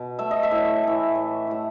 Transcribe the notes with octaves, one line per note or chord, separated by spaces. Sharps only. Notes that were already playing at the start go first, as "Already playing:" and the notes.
Already playing: B2
A3 E5
D#5
E5
A2
E3 A3
A2
E3 A3